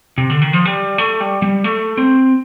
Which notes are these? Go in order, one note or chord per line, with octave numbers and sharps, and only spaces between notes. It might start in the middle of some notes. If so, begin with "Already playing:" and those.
C3
D3
D#3
F3
G3
A3
G3
G3
A3
C4